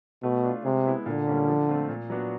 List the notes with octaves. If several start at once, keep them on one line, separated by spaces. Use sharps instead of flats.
B2 A3
D4 F4
C3 G#3
B3 E4
A#2 D3
G3 A#3 C#4
F3
A3 C4 F4
A#2
F#3 B3 D4 F#4